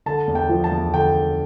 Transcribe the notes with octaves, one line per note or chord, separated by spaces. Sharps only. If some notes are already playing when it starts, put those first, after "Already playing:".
D3 A5
E2
G5
F3
A5
E2
D3 G5